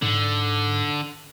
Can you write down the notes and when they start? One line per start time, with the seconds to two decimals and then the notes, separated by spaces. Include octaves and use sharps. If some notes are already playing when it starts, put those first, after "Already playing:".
0.02 G#2 D3